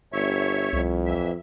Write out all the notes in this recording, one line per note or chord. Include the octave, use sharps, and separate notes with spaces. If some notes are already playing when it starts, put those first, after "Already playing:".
G1 C#5 E5 C#6
C2 F2
E3 E5